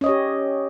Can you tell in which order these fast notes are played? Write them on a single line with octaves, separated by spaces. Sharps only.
C#4 D#5 C#5 G4